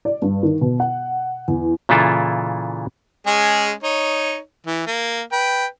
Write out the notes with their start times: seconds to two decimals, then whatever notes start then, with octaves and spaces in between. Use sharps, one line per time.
0.05 D5
0.22 G2
0.43 D#3
0.61 B2
0.80 F#5
1.48 E2
1.89 A#2 C#3 E3 E4 F4 A4
3.27 G#3 C#4 G#4
3.83 D#4 C#5
4.67 E3
4.87 A#3
5.32 B4 G5